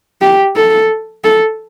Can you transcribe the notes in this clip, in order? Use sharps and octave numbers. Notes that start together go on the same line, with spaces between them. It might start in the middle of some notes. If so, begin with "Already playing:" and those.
G4
A4
A4